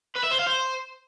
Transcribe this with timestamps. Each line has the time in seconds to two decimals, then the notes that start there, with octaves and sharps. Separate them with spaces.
0.16 B4
0.24 E5
0.32 C5
0.39 F5
0.47 C5